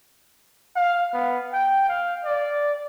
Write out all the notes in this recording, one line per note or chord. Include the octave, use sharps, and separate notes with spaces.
F5
B3
G5
F5
D5